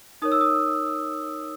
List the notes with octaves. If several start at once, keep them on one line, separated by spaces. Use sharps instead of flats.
D#4 A#4 C#5 D#6
E6
D#6